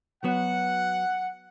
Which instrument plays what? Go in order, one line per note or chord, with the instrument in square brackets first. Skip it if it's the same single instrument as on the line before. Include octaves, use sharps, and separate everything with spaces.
[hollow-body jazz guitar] F#3 B3 F#4 [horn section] F#5